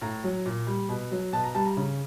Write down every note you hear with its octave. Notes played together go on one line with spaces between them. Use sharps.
A2 A#5
F#3
A#2
G3
B2
F#3
B2 A5
A#5
G3 A5
A#5
C#3